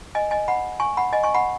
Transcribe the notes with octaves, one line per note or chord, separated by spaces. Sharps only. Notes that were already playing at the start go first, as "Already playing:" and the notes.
D#5 G#5
D#5 G#5
F#5 B5
G#5 C#6
F#5 B5
D#5 G#5
G#5 C#6
F#5 B5